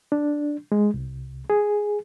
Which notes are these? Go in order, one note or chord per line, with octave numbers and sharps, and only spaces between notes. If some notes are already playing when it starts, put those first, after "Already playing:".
D4
G#3
C2
G#4